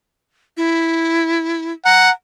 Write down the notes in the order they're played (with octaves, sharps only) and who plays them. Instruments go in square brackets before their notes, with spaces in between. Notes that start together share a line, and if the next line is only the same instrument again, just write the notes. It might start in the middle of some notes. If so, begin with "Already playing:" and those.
[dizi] E4
[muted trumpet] F#5 [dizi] A#5